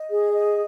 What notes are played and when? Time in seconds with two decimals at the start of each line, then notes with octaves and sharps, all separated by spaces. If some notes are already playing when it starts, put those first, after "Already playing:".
Already playing: D#5
0.11 G#4
0.33 D#5